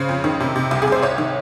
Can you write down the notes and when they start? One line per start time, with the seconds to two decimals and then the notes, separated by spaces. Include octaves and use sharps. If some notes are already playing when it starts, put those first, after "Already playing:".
Already playing: C#3 C5
0.09 F2
0.24 D#3
0.40 C3
0.56 C3
0.71 C2
0.82 G#4
0.88 C2 C5
1.02 C2 C#5
1.18 D#3